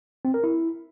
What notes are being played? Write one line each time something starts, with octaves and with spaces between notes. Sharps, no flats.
C4
A#4
E4